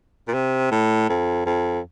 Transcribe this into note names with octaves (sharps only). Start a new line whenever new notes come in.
A#2
C3
A2
F2
F2